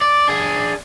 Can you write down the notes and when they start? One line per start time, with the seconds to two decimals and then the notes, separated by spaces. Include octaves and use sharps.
0.01 D5
0.28 D4 G#4